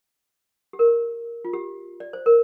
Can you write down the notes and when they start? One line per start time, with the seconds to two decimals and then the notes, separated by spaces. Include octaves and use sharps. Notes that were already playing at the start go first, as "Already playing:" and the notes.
0.73 G4
0.79 A#4
1.45 F4
1.53 G4
2.00 D5
2.13 C5
2.26 A#4